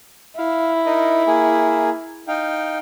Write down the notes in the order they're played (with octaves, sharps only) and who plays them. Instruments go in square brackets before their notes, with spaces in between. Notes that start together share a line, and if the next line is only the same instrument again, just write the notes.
[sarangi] E4 [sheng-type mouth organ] F5
[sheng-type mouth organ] D#4 A#4 D#5
A#3 G#4
D#4 F5 G5